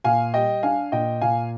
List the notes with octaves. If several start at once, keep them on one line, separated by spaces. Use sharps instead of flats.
A#2 F5 G#5
G3 D#5 G5
D4 F5 G#5
A#2 D#5 G5
A#2 F5 G#5